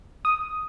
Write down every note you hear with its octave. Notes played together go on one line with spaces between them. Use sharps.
D#6